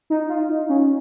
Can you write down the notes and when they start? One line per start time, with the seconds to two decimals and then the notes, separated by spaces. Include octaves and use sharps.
0.10 D#4
0.29 F4
0.49 D#4
0.69 C#4